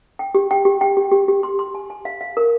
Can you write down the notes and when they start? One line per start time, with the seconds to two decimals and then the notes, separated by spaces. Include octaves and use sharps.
0.19 G5
0.35 G4
0.51 G5
0.65 G4
0.81 G5
0.97 G4
1.12 G4
1.28 G4
1.43 C6
1.59 C6
1.75 G#5
1.90 G#5
2.05 F5
2.21 F5
2.37 A#4